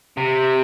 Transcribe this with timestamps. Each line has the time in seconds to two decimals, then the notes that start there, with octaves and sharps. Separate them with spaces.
0.17 C3